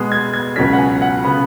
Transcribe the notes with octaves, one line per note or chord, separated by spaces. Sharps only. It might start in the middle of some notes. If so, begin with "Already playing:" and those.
Already playing: B2 G#3 B3
G#6
G#6
C#2 B2 F#3 C#4 B6
F#5
G#5
F#5
C#3 B3 B5